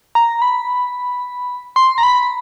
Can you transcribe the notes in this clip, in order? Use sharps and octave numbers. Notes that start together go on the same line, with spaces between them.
A#5
B5
C6
A#5
B5